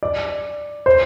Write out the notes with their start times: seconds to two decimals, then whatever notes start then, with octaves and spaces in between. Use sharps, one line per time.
0.03 D5
0.86 C5